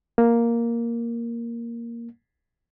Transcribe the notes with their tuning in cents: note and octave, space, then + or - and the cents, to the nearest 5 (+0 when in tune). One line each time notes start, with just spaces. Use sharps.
A#3 +0